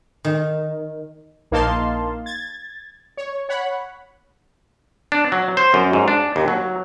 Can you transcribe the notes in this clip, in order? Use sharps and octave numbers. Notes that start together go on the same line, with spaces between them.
D#3
A#1 A#3 D#4 F5 A5 C6
G#6 A6
C#5
C#5 F#5 B5
D4
F#3
C5
F#2
G#2
D4
D#2
F#3